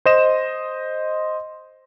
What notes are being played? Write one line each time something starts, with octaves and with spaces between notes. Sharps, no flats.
C5 D#5 E7